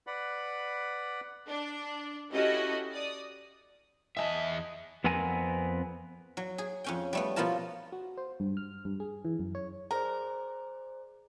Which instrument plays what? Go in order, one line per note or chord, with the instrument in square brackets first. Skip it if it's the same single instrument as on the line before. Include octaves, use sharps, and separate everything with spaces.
[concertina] B4 D5 F#5 B5
[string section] D4
C#4 E4 F#4 G4 A4 D#5
D5 D#6
[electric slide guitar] E2 G3 E5 [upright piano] D#5 G#5 A5
[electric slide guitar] F2 B3 C4 A#4 G#5
[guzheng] F#3
G#4
F2 C#4 G5
G3 A3 B3
B2 F3 B3 F4 A#4 A5
[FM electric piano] F#4
C5
G2
F6
G2
G#4
E3
F#2
C#5
[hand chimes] G#4 C5 D5 [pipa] A#4